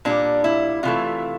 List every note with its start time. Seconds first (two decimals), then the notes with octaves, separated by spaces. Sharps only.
0.05 A#2 G3 D4
0.44 E4
0.83 C3 E3 A3 F4